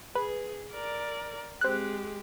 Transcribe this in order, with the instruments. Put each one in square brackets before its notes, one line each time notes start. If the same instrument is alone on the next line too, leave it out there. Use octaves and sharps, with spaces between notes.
[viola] G#4 [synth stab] B4
[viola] A#4 D5
[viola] G#3 G4 [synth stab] C4 F#6